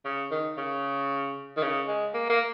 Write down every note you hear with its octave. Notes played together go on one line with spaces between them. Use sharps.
C#3
D#3
C#3
D#3
C#3
G#3
A#3
A#3